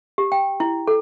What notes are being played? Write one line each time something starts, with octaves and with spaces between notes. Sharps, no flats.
G4
G5
E4
A4